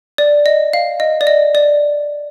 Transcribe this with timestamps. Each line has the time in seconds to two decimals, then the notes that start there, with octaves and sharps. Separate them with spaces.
0.18 D5
0.46 D#5
0.73 F5
1.00 D#5
1.21 D5
1.27 D#5
1.55 D5